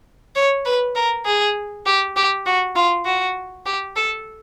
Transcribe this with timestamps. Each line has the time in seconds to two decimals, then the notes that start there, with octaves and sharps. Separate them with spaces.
0.36 C#5
0.65 B4
0.95 A#4
1.25 G#4
1.86 G4
2.16 G4
2.46 F#4
2.76 F4
3.05 F#4
3.66 G4
3.96 A4